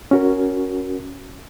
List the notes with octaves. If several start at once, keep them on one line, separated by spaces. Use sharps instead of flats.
C#4 F#4 A#4